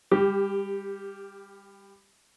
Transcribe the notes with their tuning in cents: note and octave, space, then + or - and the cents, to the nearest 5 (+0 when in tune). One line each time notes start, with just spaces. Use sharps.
G3 +30 G4 +0